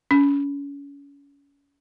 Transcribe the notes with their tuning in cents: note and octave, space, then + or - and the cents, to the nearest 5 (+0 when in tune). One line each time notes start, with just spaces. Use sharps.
C#4 +30